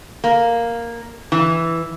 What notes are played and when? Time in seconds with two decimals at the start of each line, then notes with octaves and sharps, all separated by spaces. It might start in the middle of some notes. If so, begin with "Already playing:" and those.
0.24 A#3
1.32 E3